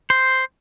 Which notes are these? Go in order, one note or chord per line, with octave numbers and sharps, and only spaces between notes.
C5